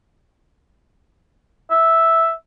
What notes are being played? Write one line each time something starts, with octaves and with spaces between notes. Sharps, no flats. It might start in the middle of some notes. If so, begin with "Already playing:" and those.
E5